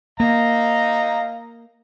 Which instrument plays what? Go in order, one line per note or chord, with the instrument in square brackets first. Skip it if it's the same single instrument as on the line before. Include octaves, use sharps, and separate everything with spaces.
[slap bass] A#3 [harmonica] D#5 F5 A#5